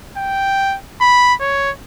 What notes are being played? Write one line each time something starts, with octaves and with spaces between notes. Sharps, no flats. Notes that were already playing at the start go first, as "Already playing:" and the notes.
G5
B5
C#5